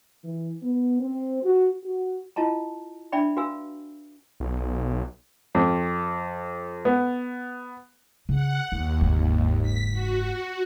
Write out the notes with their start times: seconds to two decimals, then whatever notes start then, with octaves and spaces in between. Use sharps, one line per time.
0.24 E3
0.63 B3
1.00 C4
1.43 F#4
1.84 F#4
2.36 E4 F4 D#5 A5 A#5
3.12 D4 D5 E5 G5 B5
3.37 F#4 B4 F5 G#5 E6
4.40 B1
5.55 F2
6.85 B3
8.29 C#3 F#5
8.72 D#2 F4
9.01 F#1 G#2
9.61 B6
9.92 F#4